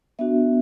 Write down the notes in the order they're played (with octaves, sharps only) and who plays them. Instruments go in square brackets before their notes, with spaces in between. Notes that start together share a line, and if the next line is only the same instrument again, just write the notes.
[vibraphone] B3 D4 F#4 E5